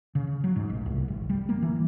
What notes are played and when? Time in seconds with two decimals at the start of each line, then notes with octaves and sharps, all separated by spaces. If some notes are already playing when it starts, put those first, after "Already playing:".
0.15 C#3
0.44 F#3
0.56 G#2
0.69 A1
0.86 C2
1.08 G#1
1.29 G3
1.49 A#3
1.62 E3